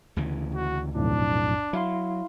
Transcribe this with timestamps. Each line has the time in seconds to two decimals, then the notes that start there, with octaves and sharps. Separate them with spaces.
0.17 D2 C#3 E3
0.55 F#4
0.95 B1 F2 A2 D4
1.73 F#3 E4 F5 C6